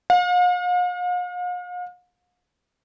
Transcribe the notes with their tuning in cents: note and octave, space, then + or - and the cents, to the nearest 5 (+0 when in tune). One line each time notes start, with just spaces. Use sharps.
F5 +45